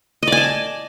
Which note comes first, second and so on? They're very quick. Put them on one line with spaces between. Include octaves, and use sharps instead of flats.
D#5 D5 G#5 A5